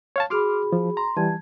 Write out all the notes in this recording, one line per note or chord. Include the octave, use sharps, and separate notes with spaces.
C#5 F5 A5
F#4 G#4 B5 C6 D6 F6
F3
A#5 C6
E3 G3 A5 G#6